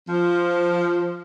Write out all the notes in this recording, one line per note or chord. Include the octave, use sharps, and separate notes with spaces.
F3